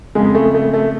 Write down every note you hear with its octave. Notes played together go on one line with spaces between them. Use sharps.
F2 C#3 G#3
A3
A3
A3